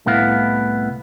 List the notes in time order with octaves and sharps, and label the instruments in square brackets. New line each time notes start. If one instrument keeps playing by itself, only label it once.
[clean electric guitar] C2 A2 B3 E4 F5